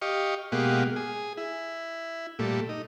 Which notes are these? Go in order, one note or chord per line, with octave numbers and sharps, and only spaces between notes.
G4 D#5 F5 C#6
B2 G#3 A#3 G4 F5 F#5
G#4
E4
A#2 G3 A3
D#4